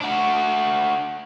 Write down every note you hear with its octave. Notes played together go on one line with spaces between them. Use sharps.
D4 F#4